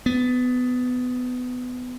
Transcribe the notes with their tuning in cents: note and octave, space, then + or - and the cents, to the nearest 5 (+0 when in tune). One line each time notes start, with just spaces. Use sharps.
B3 +20